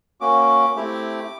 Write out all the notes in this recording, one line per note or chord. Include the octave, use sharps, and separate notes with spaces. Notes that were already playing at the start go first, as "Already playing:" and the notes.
A#3 C#4 F#4 D6
A3 C4 E4 G4